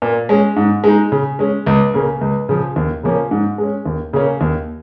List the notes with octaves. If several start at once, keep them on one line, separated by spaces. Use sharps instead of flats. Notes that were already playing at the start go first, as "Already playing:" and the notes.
A#2
G#3 C#4
G#2
G#3 D#4
C#3
G#3 C#4
C#2
C#3 A#3
C#2
C#3 F3
D#2
C#3 F3 A#3 C#4
G#2
G#3 C#4
D#2
C#3 A#3 C#4
D#2